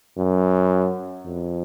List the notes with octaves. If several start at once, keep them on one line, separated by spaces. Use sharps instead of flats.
F#2
F2